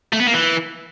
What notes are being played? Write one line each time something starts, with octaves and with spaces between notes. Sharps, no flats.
A3
B3
A#3
E3